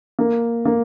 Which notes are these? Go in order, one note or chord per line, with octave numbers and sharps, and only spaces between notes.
A#3
A#3